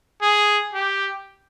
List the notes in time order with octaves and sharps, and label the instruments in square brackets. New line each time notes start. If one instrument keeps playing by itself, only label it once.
[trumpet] G#4
G4